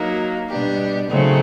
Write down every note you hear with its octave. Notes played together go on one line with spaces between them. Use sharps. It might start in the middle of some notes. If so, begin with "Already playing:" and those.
Already playing: F#3 A#3 D#4
B2 G3 B3 D4 G4
C#3 F#3 A3 C4 D#4